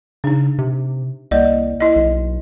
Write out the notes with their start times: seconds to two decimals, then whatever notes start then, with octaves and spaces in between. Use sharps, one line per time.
0.24 C#3 D4 D#4
0.59 C3
1.31 C2 A#3 D5 D#5
1.80 E4 D#5
1.96 B1